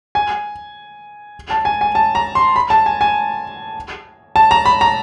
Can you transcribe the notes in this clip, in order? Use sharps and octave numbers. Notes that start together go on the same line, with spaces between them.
G#5
A5
G#5
G#5
A5
A#5
C6
B5
A5
G#5
G#5
A5
A#5
B5
A#5